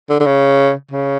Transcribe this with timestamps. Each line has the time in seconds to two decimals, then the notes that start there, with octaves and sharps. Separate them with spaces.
0.10 D3
0.20 D3
0.26 C#3
0.91 C#3